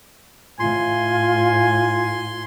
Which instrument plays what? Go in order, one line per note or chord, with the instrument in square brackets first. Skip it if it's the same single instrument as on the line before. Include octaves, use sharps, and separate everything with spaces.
[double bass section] A2 [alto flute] F4 [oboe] G#5 [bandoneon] C6